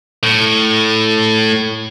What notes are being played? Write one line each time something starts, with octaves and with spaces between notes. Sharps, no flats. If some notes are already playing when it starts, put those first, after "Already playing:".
A2